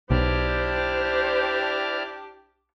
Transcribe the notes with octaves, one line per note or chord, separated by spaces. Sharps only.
B1 D4 E4 G4 C5 D5 F6